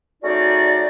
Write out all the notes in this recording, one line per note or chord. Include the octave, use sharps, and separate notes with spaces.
A3 C#4 D#4 F#4 G#4 D5